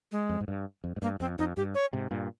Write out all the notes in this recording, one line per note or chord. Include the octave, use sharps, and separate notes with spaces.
G#3
F2
G#2
G2
F2
G#2
G2 A#3
F2 C4
F2 D#4
G2 G4
C#5
G#2 C3
G2 A#2